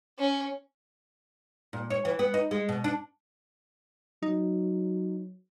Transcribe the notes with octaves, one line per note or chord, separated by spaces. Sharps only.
C#4
A#2
C#5
E3
B3
D#4
G#3
B2
D4
F#3 D#4